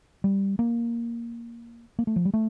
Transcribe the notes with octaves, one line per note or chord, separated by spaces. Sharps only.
G3
A#3
A#3
A3
F3
G3
A3